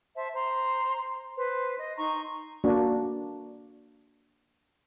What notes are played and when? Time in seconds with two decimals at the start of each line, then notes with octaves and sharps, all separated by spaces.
0.15 C5 E5 A5
0.34 C5 A#5 C6
1.36 B4 C5
1.78 D#5
1.97 D#4 A#5 C6 C#6
2.64 A#3 D4 F#4